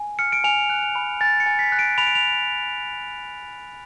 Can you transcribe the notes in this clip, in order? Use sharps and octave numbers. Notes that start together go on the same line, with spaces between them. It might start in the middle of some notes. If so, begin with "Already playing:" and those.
Already playing: G#5
F6 C#7
D7
G#5 F7
F#6
F7
B5
G#5 A6
C#7
G#5
B6
F#6
D7
B5 F7
D7
F7